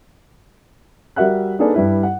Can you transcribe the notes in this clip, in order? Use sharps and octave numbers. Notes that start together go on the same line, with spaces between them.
G3 F#4 A#4 E5 F#5 F#6
A#3 D4 D#4 G#4 A4 B4
G2 G3 E4 B4
F#5